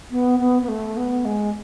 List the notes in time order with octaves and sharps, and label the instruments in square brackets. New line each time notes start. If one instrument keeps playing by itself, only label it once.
[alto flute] B3
B3
B3
A3
B3
G#3